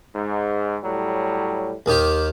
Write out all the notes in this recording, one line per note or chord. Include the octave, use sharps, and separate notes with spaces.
G#2
A2 F#3 G3
D#2 D#3 G4